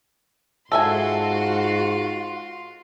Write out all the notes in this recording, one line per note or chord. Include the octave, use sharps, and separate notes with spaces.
G#2 F4 F#4 A4 E5 G#5 C6